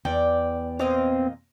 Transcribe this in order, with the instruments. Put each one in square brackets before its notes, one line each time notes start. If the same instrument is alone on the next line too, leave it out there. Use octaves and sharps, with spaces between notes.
[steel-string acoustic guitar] E2 G5 [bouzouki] D5
[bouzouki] A#2 D#5 F5 [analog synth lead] C4